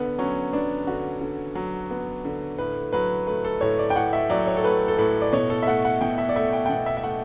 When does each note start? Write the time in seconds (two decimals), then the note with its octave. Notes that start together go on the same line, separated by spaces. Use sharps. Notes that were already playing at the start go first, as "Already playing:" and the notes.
Already playing: D3 B3
0.18 F#3 C#4
0.53 B3 D4
0.87 D3 F#4
1.21 D3
1.55 F#3
1.91 B3
2.25 D3
2.59 A2 B4
2.93 F#3 B4
3.27 A3 B4
3.44 A4
3.61 A2 C#5
3.79 D5
3.90 G5
3.96 A2 F#5
4.13 E5
4.30 F#3 D5
4.47 C#5
4.57 A4
4.64 A3 B4
4.88 A4
4.98 A2 B4
5.21 D5
5.33 B2 C#5
5.50 A4
5.63 E5
5.67 A3 F#5
5.85 F#5
6.01 B2 G5
6.18 E5
6.29 D5
6.36 A3 E5
6.53 G5
6.66 G5
6.70 B2 F#5
6.86 E5
6.97 E5
7.04 A3 F#5